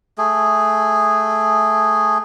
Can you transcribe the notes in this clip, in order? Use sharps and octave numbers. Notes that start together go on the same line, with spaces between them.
A3 G#4